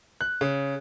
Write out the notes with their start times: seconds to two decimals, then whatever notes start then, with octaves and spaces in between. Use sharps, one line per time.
0.21 F#6
0.41 C#3